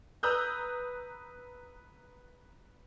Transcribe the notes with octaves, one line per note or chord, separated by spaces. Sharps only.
B4 A#5 D#6 E6 F#6 G6